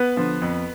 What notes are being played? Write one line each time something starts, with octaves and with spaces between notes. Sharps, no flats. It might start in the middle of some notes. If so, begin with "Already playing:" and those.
Already playing: B3 B4
D3 F3
F2